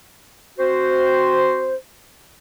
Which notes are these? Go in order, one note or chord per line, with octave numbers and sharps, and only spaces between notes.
C4 F#4 C5